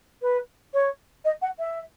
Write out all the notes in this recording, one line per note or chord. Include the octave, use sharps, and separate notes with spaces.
B4
C#5
D#5
F#5
E5